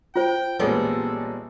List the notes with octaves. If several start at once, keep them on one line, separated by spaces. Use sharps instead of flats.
F4 C5 G5
A1 A#2 G3 G#3 B3 A4